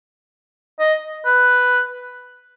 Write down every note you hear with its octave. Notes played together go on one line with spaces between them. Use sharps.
D#5
B4